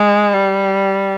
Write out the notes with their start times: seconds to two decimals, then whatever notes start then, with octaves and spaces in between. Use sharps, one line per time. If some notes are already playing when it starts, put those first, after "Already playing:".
Already playing: G#3
0.34 G3